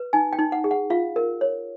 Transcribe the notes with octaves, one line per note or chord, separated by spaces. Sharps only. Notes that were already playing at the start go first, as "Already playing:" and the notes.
Already playing: B4
D#4 G#5
G5
D#4
F#5
G#4
F#5
F4 F5
A#4
C#5